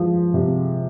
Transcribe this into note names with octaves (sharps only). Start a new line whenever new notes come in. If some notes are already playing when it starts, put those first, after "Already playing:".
Already playing: F3 G#3
C3